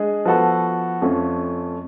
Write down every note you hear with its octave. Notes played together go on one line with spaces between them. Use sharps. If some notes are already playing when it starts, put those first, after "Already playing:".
Already playing: G#3 D4 G#4
F3 B3 F#4 A4
F2 F3 A3 C#4